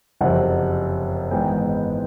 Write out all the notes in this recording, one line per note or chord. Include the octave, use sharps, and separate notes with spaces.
F#1 F2 C3 F#5
G#1 G#2 E3 G#3 B3 G5